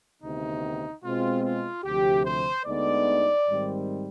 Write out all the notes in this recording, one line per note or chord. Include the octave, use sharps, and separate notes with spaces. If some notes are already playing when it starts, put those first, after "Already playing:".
D2 C3 D#3 B3 D#4
B2 G#3 C4 F4
F4
D2 C3 F3 G4
C5
D2 D3 G#3 B3 D#4 D5
G#2 D#3 G3 C4